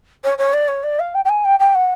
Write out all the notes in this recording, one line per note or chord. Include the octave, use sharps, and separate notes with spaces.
C#5
C#5
D5
C#5
D5
F5
G5
G5
G#5
G5
G5
F#5